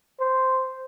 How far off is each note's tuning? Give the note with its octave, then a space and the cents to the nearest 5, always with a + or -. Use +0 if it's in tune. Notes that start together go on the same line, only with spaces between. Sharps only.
C5 -5